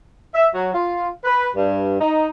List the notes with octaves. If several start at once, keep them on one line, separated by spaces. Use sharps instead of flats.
E5
F#3
F4
B4
G2
D#4